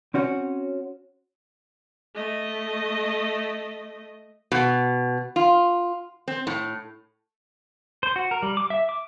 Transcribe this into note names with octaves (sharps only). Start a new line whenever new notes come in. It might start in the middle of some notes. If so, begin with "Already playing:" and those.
C4 C#4 F#4 C#5
A3 D#5
B2
F4
C4
A2
C5
F#4
A#4
G3
D6
E5
D6